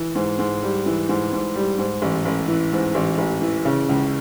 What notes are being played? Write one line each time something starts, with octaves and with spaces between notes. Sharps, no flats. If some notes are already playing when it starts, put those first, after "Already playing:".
Already playing: E3
G#2
G#2
G3
E3
G#2
G#2
G3
G#2
A1
A1
E3
G#2
A1
A1
E3
C#3
C#2